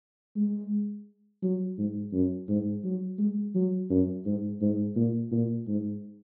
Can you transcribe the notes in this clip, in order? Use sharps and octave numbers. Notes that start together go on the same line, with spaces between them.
G#3
F#3
G#2
F#2
G#2
F#3
G#3
F#3
F#2
G#2
G#2
A#2
A#2
G#2